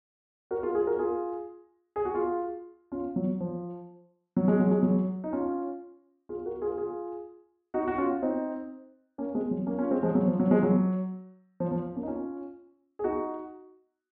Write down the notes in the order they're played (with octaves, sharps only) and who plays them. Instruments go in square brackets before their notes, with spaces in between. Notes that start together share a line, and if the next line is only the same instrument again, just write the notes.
[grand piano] F#4 A#4
F4 G#4
F4 G#4
F#4 A#4
F4 G#4
G#4
F#4
F4 G#4
C#4 F4
F#3
F3
F#3
G#3
F#3
G#3
F#3
D#4
C#4 F4
F4 G#4
F#4 A#4
F4 G#4
F4 G#4
D#4 F#4
F#4
C#4 F4
C4 D#4
A#3 C#4
G#3 C4
F#3
A#3 C#4
C#4 F4
G#3 C4
F3 G#3
F#3
F3
F#3
F3 G#3
F#3
F3
F3
A#3 C#4
D#4
C#4 F4
G#4
D#4 F#4